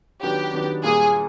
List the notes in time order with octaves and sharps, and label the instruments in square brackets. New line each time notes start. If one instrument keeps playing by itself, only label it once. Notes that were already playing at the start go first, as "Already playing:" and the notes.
[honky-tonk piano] D#3 F#3 B3 D4 [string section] G4
[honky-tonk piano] D#3 F#3 B3 D4
[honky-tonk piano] A#2 G3 A#3 [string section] G#4